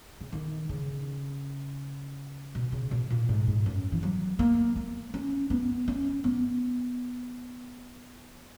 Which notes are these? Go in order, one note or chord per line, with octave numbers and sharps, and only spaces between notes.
C#3
D#3
C#3
B2
C#3
B2
A#2
G#2
G#2
F#2
E3
F#3
A#3
A#3
C#4
B3
C#4
B3